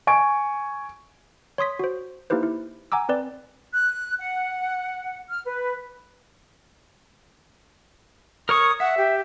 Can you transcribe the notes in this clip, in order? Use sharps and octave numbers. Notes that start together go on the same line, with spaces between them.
G#5 C#6 D7
C#5 C6 D#6 B6
F#4 C5
A#3 D#4 E4 G4 B4 C5
E4
F#5 G#5 A#5 D6 E6
C4 B4 D5
F#6
F#5
F6
B4
A#4 C#5 C#6 D#6
E5 F#5
G4